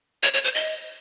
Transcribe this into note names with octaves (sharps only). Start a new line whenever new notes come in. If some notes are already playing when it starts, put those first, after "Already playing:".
C#5
C#5
C5
D#5